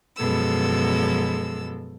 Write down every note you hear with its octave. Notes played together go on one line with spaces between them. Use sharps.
F#2 B2 F3 G#3 A4 E6